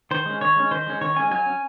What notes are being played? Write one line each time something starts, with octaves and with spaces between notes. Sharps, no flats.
D#3 C5
G#3 C#4
D#3 C#5
G#3 C#4
D#3 C5
G#3 C#4
D#3 C#5
G#3 C#4 G#5
F#3 G#5
C#4